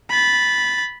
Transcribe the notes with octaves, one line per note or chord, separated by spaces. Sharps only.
B5 A6